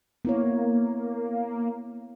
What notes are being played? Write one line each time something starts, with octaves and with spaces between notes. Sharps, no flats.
A#3 B3 E4 C#5